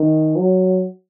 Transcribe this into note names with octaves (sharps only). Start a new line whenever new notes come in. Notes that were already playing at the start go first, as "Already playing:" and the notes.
Already playing: D#3
F#3